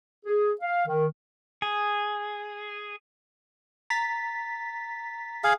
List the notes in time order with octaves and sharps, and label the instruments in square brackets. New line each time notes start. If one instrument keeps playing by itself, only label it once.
[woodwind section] G#4
F5
D#3
[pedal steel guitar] G#4
[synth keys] A#5 A6 B6
[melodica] G#4 F5